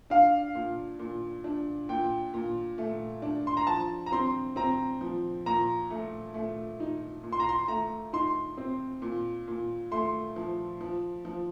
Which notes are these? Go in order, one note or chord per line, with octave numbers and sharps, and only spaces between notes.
D4 F5
A#2
A#2
D4
A#2 G5
A#2
A3
D4
C6
A#5
F3 A5
A#5
C4 C6
C4 A#5
F3
A#2 A#5
A3
A3
D#4
A#2
C6
A#5
C6
A3 A#5
D#4 C6
C4
A#2
A#2
A3 C6
F3
F3
F3